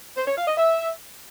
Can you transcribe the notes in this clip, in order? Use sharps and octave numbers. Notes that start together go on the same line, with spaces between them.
C5
C#5
F5
D#5
E5